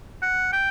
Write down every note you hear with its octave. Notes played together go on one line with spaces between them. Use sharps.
F#5
G5